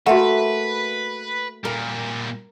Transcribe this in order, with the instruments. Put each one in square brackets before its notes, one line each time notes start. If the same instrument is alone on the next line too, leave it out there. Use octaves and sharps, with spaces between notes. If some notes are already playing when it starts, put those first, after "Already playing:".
[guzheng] A3 A#3 [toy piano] F#4 E5 F#5 [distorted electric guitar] B4
[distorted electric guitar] A#2 G3 [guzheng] A#4